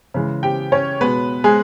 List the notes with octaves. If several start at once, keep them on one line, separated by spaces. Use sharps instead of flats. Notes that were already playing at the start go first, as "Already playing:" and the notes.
C#3 E3 G#3
G4 G5
C#4 C#5
B2 G#3 B3 B4
G#3 G#4